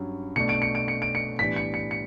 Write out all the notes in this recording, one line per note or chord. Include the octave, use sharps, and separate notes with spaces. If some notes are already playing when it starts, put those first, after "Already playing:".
Already playing: G2 F#3 C#4
B2 A3 D4 C#7
D7
C#7
D7
C#7
D7
C#7
A2 E3 G3 B3 D4 B6
C#7
C#7
C#7